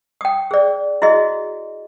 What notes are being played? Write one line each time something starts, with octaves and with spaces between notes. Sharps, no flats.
G5 D#6
G#4 D5
E4 F#4 G#4 D#5